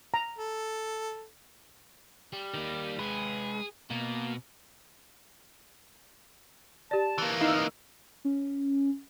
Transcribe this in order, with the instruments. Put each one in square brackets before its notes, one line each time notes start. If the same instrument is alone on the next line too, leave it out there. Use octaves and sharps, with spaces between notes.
[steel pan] A#5
[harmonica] A4
[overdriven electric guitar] G3
[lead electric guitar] D#3 A#3
[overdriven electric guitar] G#3 B4 [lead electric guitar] G#4
[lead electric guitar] B2 [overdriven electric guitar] A#3
[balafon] G4 D5 [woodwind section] A5
[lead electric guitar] E3 A#3
[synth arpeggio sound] D#4 E4 E6 [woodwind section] D#5 F5
[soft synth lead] C#4